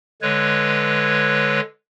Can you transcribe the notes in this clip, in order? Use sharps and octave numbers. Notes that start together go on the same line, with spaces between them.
D3 G#3 B4 C#5